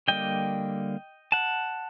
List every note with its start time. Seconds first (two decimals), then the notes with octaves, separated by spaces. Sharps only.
0.08 D3 G3 A#3 D#5 G5
1.32 F#5 A5